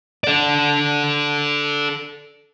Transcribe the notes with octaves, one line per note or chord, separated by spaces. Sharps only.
A4 D5